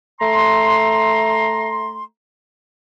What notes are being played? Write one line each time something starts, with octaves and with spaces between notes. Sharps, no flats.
A3 A#5 C6